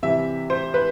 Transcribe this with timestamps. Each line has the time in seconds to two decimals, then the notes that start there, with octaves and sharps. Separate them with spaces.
0.03 C3 E3 G3 E5
0.50 C5
0.74 B4